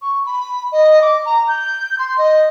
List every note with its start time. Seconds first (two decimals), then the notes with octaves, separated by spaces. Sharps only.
0.02 C#6
0.26 B5
0.72 D#5
1.02 D6
1.26 A#5
1.48 G6
1.99 C6
2.18 D#5